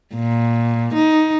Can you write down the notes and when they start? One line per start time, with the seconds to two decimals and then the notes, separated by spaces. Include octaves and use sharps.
0.15 A#2
0.94 D#4